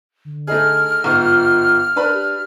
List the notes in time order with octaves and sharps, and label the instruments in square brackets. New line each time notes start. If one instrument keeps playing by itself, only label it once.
[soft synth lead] D3
[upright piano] A3 D#4 G#4 [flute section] F6
[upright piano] G1 G#2 [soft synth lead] F4
[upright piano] D4 B4 B5 [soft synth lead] A#4
[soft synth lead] G4